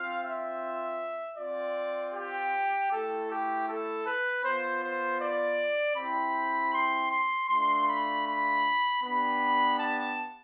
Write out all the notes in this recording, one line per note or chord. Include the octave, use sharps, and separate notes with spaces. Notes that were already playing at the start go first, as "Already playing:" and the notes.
Already playing: C4 F4 F5
E5
C4 F4 D5
G4
A3 E4 G4 A4
G4
A4
B4
B3 F4 C5
C5
D5
C4 E4 G4 B5
C6
C6
A3 D4 F4 C6
B5
B5
B3 D4 G4 B5
A5